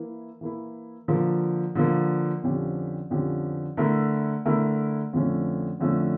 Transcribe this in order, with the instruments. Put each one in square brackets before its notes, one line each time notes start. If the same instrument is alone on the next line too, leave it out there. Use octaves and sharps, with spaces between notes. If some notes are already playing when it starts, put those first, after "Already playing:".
Already playing: [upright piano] E3 A#3 E4
E3 A#3 E4
D3 F3 A#3
D3 F3 A#3
F2 D3 F3 C#4 G4
F2 D3 F3 C#4 G4
D3 A3 E4 A#4
D3 A3 E4 A#4
F2 D3 F3 A3 C#4
F2 D3 F3 A3 C#4